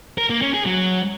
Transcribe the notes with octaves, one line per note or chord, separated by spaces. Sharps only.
A#4
A#3
C#4
G#4
F#3